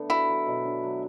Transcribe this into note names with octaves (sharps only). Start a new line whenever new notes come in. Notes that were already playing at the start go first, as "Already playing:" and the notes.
Already playing: D3 A3 B3 D4
E4 F#4
F#3
B2
D4
F#3